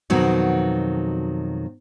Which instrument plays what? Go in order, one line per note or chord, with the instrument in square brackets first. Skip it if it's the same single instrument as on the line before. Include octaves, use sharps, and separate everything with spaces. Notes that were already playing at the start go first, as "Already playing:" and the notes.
[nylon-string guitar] F2 B2 D#3 F#3 B3